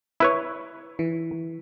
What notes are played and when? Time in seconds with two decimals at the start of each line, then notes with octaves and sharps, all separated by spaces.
0.20 E4 B4 C#5
0.99 E3